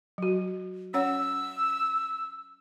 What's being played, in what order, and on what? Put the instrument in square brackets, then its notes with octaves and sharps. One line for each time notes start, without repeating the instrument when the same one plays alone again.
[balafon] F#3 F#4
[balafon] C#4 C#5 F#5 [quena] E6